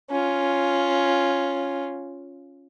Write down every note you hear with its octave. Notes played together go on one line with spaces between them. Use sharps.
C#4 F4